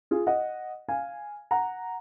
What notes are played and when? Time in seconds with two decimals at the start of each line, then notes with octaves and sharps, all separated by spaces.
0.11 F4 G#4
0.27 D#5 F#5
0.88 F5 G#5
1.51 F#5 A#5